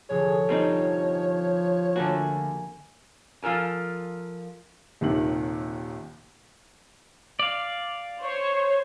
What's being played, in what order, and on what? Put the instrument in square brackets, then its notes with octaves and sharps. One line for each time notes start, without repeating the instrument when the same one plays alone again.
[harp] F1 D3 [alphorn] G#4 [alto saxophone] C#5
[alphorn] F3 [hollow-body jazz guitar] G3 C4 D#4
[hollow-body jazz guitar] D3 A3 F#4 [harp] A#3 G#5
[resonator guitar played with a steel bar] F3 F4 A4 A#4 G#5
[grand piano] D#1 D#2 C3 D#3 F#7
[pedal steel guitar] D5 F5
[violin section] C5 C#5